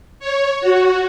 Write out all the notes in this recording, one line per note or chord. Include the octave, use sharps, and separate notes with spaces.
C#5
F#4